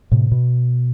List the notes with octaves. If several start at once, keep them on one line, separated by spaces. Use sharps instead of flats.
A2 C3
B2